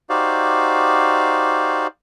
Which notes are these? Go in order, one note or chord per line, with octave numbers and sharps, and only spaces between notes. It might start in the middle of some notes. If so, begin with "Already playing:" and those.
D#4 F#4 G4 C5 D5 F5